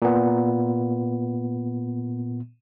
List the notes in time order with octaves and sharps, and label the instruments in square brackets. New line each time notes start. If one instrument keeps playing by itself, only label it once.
[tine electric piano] A#2 B3